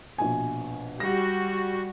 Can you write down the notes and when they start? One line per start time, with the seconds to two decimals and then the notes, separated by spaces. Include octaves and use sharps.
0.18 A#1 B2 G#5
1.00 G3 F#4 A#6